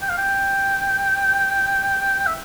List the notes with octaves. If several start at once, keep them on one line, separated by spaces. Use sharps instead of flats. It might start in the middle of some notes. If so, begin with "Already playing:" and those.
G5
F5
G5
E5